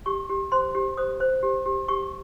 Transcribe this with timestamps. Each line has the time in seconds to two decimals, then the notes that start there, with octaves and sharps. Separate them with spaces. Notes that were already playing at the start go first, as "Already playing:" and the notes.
0.06 G4 C#6
0.29 G4
0.52 C5 C6
0.75 G4
0.97 C5 D#6
1.20 C5
1.43 G4
1.66 G4
1.88 G4 C#6